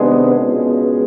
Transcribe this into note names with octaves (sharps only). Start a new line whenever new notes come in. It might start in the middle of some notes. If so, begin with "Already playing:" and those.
Already playing: C3 D#3 G#3 B3 D4
C#2 B2 G#3